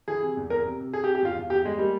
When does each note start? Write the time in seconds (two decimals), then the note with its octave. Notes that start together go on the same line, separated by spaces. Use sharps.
0.08 E3 G#4
0.22 C3
0.37 E2
0.50 E2 A#4
0.65 C3
0.80 C3
0.93 C3 G#4
1.04 G4
1.08 C3
1.15 G4
1.22 E2 F4
1.37 E2
1.50 E2 G4
1.64 E2 G#3
1.78 G3 A#3